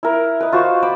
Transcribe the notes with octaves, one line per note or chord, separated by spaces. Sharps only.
E4 A#4
B4 D#5
F4 F#4 C5 C#6
C5 B5 D6